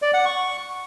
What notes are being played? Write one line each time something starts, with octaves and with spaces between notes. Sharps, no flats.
D5
F#5
C#6